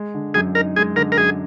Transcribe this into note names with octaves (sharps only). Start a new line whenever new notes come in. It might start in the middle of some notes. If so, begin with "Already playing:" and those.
Already playing: G#3
D3
F#2 G#4
D#4 A#4
G#3 G#4
D3 A#4
A#4
F#2 G#4